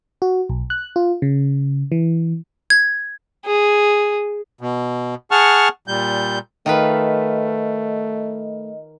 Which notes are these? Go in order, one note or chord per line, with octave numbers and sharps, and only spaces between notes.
F#4
B1
F#6
F4
C#3
E3
G#6
G#4
B2
G#4 F#5 A5 C#6 F6
A#2 G3 G6
D#3 A3 F4 B4 D#5